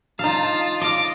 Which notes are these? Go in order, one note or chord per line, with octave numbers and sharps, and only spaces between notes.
D#4 F4 F5 A5
D#5 F5 D6